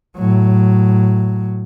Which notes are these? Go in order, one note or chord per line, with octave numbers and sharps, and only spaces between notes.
A2 F#3